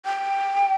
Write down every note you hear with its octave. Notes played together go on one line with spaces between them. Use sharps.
G5